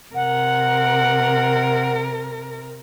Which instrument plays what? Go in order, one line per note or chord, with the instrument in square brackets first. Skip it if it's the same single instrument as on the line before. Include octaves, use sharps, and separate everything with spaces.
[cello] C3 A#4 [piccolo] F#5